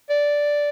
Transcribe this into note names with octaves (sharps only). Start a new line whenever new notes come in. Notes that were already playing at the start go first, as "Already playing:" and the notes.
D5